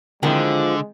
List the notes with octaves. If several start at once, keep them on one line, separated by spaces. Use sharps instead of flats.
D3 D#3 F3 G#3 C4 E4